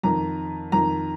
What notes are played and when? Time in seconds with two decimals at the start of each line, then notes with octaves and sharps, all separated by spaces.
0.03 F2 D#3 A#5
0.72 F2 D#3 A#5